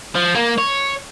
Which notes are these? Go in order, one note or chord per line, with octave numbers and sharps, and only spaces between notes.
F3
A#3
C#5